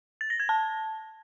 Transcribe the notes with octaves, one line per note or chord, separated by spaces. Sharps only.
A6
A#6
G#6
A5